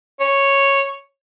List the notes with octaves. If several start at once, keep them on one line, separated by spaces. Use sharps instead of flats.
C#5